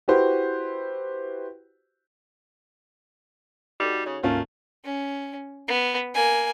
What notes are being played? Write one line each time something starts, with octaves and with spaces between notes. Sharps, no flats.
E4 F#4 G4 B4 C5
G3 D#4 F#4 A4
C#3 C#5
D2 G#2 C3 A3 A#3 C#4 F4
C#4
B3
A#3 G#5